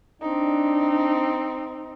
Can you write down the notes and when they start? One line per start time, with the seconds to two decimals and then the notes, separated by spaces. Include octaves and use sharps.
0.22 C4 D4 D#4